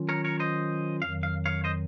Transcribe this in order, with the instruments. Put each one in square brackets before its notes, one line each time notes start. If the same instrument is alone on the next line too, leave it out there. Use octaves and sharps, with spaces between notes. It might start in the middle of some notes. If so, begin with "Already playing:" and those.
Already playing: [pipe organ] D#3 F#3 C#4 F4
[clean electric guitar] A#4 C#5
A#4 C#5
C5 D#5
[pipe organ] F2 D#3 F#3 [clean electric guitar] F5
[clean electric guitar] F5
C#5 F5
C5 D#5